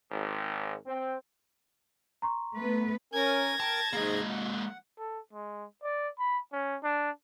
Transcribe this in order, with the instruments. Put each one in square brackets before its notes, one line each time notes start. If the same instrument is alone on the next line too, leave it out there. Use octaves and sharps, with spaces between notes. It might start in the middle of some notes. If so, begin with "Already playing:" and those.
[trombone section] G#1
C4
[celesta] A#5 C6 C#6
[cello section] A3 B3 B4
[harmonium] C#4 A#4 G#5 [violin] G#6 A#6
[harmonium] A#4 G5 [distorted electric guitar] A5
[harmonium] G#2 G#4 [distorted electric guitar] G#3 A#3
[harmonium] F#5
[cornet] A4
G#3
D5
B5
C#4
D4